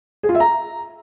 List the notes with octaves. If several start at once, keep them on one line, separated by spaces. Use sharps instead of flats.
G#4
F4
E5
A#5